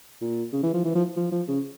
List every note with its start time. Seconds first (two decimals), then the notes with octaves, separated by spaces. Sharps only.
0.21 A#2
0.53 C#3
0.63 E3
0.74 F3
0.85 E3
0.95 F3
1.17 F3
1.31 F3
1.48 C#3